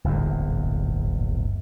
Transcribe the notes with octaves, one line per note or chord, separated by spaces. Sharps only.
D1 G1 E2 A#2